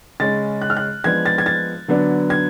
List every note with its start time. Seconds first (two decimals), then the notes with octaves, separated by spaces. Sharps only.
0.20 C#3 G#3 C#4 A6
0.62 F#6
0.70 F6
0.77 F#6
1.04 F3 G#3 B3 D4 G#6
1.26 A6
1.38 G#6
1.46 A6
1.88 D3 F#3 B3 D4
2.30 G#6